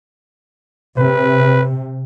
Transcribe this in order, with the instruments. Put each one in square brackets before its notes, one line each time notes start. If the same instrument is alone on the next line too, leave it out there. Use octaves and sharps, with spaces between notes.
[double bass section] C3 [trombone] B4